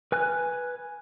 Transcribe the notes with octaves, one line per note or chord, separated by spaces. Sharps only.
B4 G#5 F6 F#6